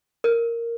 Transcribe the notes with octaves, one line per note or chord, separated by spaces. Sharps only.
A#4